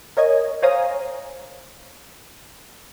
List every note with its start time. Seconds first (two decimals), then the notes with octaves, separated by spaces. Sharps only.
0.17 A#4 C#5 D#5 G#5
0.62 C5 C#5 F5 G#5 A#5 D#6